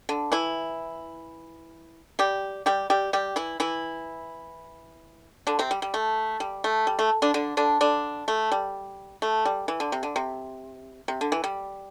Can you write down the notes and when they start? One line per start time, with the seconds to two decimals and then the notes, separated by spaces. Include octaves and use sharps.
0.09 D3
0.32 E3 E4
2.19 G3 G4
2.66 G3 G4
2.90 G3 G4
3.13 G3 G4
3.36 E3 E4
3.60 E3 E4
5.47 D3 D4
5.59 C3 C4
5.71 G3
5.82 G3
5.94 A3
6.40 G3
6.64 A3
6.87 G3
6.99 A3
7.22 D3 D4
7.34 D3 D4
7.57 D3 D4
7.81 D3 D4
8.28 A3
8.52 G3
9.22 A3
9.45 G3
9.68 E3
9.80 D3
9.92 C3
10.03 D3
10.16 C3
11.08 C3
11.21 D3
11.32 E3
11.44 G3